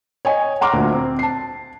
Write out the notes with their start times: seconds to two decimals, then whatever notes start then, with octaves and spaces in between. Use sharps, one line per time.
0.25 C#5 D#5 G#5
0.61 F#5 A#5 C6 D6 F6
0.73 D2 A#2
0.94 C4
1.19 A5 C7